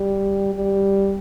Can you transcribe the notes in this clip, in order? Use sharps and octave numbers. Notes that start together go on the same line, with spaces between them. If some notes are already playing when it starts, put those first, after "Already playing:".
Already playing: G3
G3